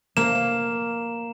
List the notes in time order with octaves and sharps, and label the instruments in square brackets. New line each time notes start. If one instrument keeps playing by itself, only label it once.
[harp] A#3 [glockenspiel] E7